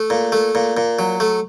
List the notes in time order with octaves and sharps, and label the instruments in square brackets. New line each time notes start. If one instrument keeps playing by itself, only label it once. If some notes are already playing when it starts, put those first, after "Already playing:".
Already playing: [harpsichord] A3
A#2
A3
A#2
A#2
F#3
A3